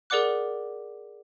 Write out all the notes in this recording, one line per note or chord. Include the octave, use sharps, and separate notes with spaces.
G#4 A#4 D5 F#5 D6 F#6